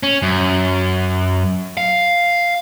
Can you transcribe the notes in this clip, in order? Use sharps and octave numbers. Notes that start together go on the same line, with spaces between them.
C#4
F#2
F5